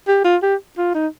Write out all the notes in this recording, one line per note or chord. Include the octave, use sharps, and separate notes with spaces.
G4
F4
G4
F4
D#4